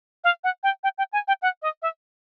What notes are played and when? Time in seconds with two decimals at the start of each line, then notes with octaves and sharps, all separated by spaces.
0.24 F5
0.44 F#5
0.63 G5
0.84 G5
0.98 G5
1.13 G#5
1.28 G5
1.42 F#5
1.62 D#5
1.82 E5